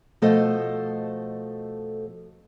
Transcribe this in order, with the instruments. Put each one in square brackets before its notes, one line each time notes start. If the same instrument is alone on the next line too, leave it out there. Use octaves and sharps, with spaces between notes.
[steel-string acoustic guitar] B2 F3 A3 A4 C5 D#5